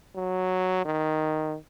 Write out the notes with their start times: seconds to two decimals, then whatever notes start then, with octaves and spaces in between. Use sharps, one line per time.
0.16 F#3
0.85 D#3